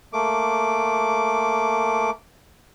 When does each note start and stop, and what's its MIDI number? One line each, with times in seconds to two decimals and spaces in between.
0.13 2.10 57
0.13 2.10 58
0.13 2.10 86